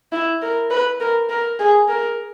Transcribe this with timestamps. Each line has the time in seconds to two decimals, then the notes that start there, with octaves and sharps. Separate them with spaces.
0.12 E4
0.42 A#4
0.71 B4
1.00 A#4
1.29 A#4
1.59 G#4
1.88 A#4